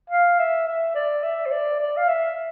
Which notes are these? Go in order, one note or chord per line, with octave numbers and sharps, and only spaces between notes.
F5
E5
E5
D5
E5
C5
D5
D5
F5
E5